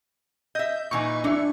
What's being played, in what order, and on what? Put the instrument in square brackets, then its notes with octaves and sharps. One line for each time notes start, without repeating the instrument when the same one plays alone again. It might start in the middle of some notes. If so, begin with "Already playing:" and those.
[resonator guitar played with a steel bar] D#5 E5 [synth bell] G6
[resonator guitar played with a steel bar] A#2 E3 D#4 [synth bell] G#5 C#6
[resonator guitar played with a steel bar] F#3 A3 [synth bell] D4 E4